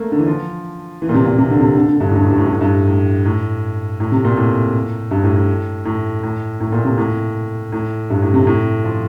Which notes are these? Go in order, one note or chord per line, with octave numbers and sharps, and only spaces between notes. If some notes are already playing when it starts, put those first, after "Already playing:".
Already playing: A3 A#3
D3
E3
F3
E3
A#2
C3
A#2
C3
D3
C3
D3
D3
G2
A2
G2
A2
G2
A2
G2
A2
G2
A2
A2
A2
C3
A#2
A2
G2
A2
A2
A2
A2
A2
A#2
C3
A2
A2
G2
A2
C3
A2
F3